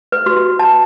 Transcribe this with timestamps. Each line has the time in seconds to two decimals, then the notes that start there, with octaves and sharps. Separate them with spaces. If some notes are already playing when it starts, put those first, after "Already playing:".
0.12 B4
0.26 F#4
0.59 A5